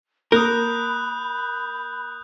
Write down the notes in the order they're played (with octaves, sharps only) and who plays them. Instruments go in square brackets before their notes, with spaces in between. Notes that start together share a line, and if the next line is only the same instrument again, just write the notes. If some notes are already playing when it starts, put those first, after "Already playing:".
[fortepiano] A#3 [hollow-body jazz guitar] A#4 [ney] B5 [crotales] D#6 F#6 G6